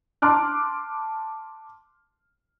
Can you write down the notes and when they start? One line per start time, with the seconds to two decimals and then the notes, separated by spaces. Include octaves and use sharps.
0.22 A5 C6 D6 F6 F#6